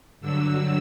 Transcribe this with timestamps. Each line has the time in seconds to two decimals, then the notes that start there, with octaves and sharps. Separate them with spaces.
0.21 G2 D3 F#3 E6